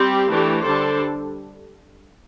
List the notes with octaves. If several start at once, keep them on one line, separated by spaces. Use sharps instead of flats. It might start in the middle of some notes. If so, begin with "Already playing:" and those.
Already playing: G3 C4 G4
E3 A3 D4 G4
D3 G3 D4 A4 C5